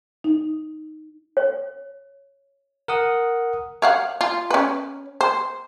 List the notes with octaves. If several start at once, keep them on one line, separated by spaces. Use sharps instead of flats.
D#4
C#5
A#4 F#5 D#6
C#5 F5 F#5
F4
C#4 B4
C5